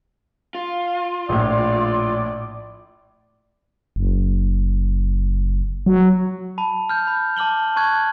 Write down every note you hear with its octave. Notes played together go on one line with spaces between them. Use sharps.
F4
A#1 A2 D5
F#1
F#3
A5 B5
F6 G6
B5
A5 D6 F6 F#7 G7
A5 C#6 F#6 G#6